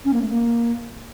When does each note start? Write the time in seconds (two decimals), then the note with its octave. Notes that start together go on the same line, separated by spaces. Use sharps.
0.05 C#4
0.13 A#3
0.21 A3
0.29 A#3